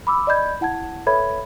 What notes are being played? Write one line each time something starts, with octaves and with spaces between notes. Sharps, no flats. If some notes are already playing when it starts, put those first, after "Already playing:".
B5 D6 E6
D5 D#5 B5 G6 G#6
E4 F#5 A5 G#6
A4 B4 C#5 E5 B5 G#6